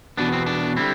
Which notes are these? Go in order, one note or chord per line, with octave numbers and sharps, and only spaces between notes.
E2 B2 B3 D4
C4
D4
D3 G3 C4 E4